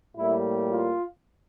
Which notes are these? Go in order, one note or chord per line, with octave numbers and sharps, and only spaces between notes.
A2 G3 A#3 E4
F4